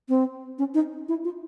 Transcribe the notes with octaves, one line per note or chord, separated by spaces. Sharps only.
C4
C#4
D#4
E4
F4